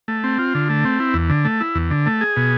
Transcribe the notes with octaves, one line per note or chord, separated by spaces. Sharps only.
A3
C4
F4
D3
A3
C4
E4
E2
D3
A3
E4
E2
D3
A3
G#4
B2